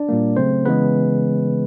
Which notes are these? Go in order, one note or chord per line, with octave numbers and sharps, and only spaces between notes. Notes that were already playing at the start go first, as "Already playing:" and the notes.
Already playing: D4 D5
A#2 G3 A#3
C#3 F#3 A3 C4 C5
C#3 E3 G#3 B3 B4